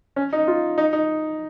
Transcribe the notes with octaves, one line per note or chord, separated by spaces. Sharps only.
C#4
D#4
F4
D#4
D#4